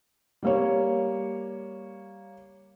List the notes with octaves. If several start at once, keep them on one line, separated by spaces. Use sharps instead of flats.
G3 A#3 C#5